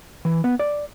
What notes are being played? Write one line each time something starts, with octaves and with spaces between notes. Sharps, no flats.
E3
B3
D5